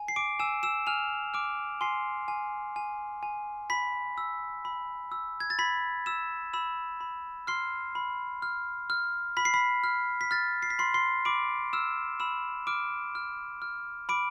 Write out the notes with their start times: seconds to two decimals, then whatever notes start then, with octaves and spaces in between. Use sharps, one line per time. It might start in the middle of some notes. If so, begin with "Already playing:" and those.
Already playing: G#5
0.08 C7
0.16 D6 D7
0.40 G#5 E6 E7
0.63 E6 E7
0.87 G#5 F6 F7
1.34 D6 F6 D7
1.81 G#5 C6 C7
2.28 G#5
2.76 G#5
3.23 G#5
3.70 B5 B6
4.18 E6
4.65 B5
5.12 E6
5.40 G#6
5.50 A6
5.59 B5 B6
6.06 E6 E7
6.53 B5 E6 E7
7.01 B5
7.47 C6 F6 C7
7.95 B5
8.42 F6
8.90 F6
9.37 B5 B6
9.45 C7
9.54 B5 B6
9.84 F6
10.21 B6
10.31 F6 A6
10.62 C7
10.70 B6
10.79 B5 C6 C7
10.94 C6 C7
11.25 B5 D6 D7
11.73 E6 F6 E7
12.20 B5 E6 E7
12.67 D6 F6 D7
13.15 F6
13.62 F6
14.09 B5 D6 D7